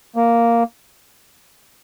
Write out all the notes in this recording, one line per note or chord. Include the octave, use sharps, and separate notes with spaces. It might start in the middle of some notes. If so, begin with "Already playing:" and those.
A#3